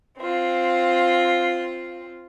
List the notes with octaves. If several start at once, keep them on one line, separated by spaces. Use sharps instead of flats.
C4 F4